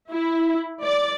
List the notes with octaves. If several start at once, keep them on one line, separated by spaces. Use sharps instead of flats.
E4
D5